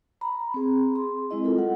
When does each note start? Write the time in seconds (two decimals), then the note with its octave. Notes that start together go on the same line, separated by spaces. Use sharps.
0.21 A#5 B5
0.54 C4 G#4
0.95 G#4 C6
1.31 G#3 C4 E4 D#5
1.44 F4 A4 A#4
1.56 G3 F#5